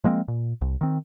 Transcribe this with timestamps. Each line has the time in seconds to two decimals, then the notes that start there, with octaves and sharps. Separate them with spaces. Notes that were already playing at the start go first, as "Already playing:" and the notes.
0.04 F3 G#3 A#3 C4
0.28 A#2
0.61 C2
0.81 D#3 C4